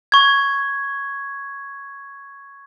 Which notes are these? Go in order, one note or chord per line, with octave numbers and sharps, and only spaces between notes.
C#6 G#6